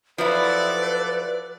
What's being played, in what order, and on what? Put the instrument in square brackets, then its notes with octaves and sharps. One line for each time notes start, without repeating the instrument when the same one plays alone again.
[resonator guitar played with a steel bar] F3 F#3 E4 [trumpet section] A4 D5 [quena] B4